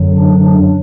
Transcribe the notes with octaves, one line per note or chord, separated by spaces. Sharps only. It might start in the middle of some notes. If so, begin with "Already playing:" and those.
Already playing: F#2 D3 F#3
D4